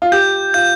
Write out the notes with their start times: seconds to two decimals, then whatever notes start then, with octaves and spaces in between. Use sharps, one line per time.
0.02 F4
0.12 G4 G6
0.54 F4 G6